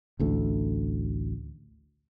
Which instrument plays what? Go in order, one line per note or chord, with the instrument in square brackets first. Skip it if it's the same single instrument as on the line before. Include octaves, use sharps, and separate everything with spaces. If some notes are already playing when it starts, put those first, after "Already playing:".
[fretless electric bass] A1 D2 A3